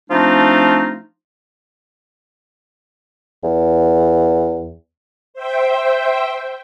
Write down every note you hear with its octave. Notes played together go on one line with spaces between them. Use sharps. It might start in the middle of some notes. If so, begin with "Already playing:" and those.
F3 A3 C4 D4 D#4 F4
E2
C5 E5 G5